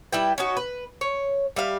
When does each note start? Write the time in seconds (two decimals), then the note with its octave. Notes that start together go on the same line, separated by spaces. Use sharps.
0.12 G3 E4 B4 G5
0.38 C#4 D#4 F#4
0.57 B4
1.01 C#5
1.56 G3 E5 F5